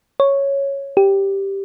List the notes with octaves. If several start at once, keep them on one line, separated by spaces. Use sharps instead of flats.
C#5
G4